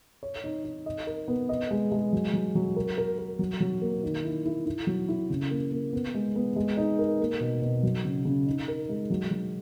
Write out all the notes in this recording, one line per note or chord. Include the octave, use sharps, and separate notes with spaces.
C#5
D#4
D#4
D#5
A#4
B3
D#5
G#3
G#3
F#3
F#3
F#3
A#4
A#4
A#4
F#3
F#3
A#3
D#3
E4
E4
E4
F#3
E4
C#3
A#3
A#3
B3
G#3
B3
G#3
D#4
A#4
A#3
B2
B2
F#3
C#3
C#3
D#4
A#4
G#3
F#3
F#3